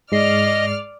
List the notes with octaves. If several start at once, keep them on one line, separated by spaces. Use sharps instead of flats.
G#2 G#3 D5 D#5 F6 C7